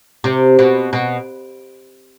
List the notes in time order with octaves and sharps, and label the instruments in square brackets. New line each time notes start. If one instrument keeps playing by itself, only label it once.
[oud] C3
B2
B2